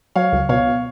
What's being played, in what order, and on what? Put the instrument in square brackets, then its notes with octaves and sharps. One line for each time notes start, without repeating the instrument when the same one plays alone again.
[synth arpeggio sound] F#3 [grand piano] C#5 F5
[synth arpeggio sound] C#2
[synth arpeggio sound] B2 [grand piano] C#5 F5